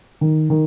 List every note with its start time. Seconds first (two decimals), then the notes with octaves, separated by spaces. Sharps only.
0.21 D#3
0.50 D#3